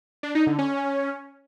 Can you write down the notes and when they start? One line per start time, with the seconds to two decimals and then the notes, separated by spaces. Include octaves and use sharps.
0.23 D4
0.35 D#4
0.47 D3
0.59 C#4